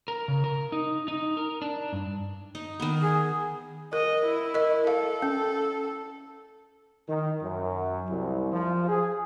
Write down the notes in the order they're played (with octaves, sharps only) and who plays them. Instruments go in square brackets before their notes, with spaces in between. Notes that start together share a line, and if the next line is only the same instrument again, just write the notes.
[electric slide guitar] A#4
C#3
A#4
D#4
D#4
A#4
D4
G2
[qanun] D#4
D#3 B3
[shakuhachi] G#4
[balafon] A#4 [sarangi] D#5
[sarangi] E4
[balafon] A#4 D#5
[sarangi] A4 [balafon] F5
[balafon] C#4
[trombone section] D#3
F#2
C2
F3
G#4